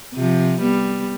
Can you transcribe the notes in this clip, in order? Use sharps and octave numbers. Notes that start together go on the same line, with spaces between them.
C3 F3
G3 B3